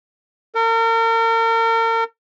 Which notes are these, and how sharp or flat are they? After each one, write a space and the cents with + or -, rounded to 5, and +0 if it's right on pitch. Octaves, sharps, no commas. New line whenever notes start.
A#4 -40